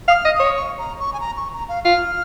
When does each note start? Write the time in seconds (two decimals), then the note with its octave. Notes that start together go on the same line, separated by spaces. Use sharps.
0.08 F5 D#6
0.14 F6
0.25 D#5
0.35 D#6
0.40 C#5
0.56 C#6
0.78 A#5
1.00 C#6
1.13 G#5
1.20 A#5
1.37 C#6
1.53 A#5
1.69 F5
1.84 F4 F6